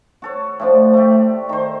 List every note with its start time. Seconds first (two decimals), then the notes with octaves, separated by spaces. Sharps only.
0.22 F#4 A4 C#5
0.60 A2 F3 D4
0.94 A3 G4
1.49 D#3 C5